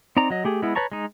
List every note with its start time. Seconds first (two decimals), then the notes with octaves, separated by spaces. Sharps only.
0.17 C4 D#4 D5 A#5
0.30 F#3 D#5
0.45 A3 G4 G#4
0.62 G#3 B3 E4
0.75 B4 C#5 A5 A#5 C#6
0.92 G#3 D#4